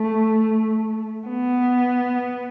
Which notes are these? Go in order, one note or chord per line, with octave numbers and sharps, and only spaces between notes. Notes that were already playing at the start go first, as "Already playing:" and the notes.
Already playing: A3
B3